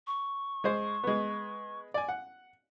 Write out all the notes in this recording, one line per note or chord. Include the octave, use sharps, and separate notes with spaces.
C#6
G#3 C5
G#3 B3
D5 G#5
F#5